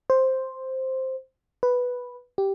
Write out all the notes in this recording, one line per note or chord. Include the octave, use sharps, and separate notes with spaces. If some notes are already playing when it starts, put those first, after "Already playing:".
C5
B4
G4